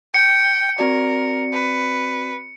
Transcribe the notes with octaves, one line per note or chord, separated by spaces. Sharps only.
G5 C#7
C4 F#4 A#4 D5
B4